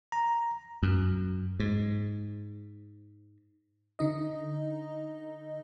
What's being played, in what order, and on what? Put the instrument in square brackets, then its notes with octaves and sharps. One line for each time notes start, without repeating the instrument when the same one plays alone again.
[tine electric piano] A#5
[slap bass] F#2
G#2
[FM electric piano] D3 D#4 D#5